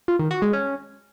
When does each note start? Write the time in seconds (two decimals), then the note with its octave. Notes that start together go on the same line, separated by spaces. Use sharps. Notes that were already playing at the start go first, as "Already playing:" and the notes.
0.08 F4
0.19 D#3
0.31 F#4
0.42 G#3
0.53 C#4